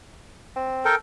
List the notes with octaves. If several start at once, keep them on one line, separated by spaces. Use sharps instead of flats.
C4
A4 A#4 G5